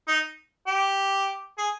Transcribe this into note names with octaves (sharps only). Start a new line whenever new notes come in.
D#4
G4
G#4